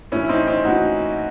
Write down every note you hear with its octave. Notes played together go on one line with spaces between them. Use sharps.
A2 E3 C#4 E4
E4
C4 D#4
C4 D#4
A2 E3 D#4 F#4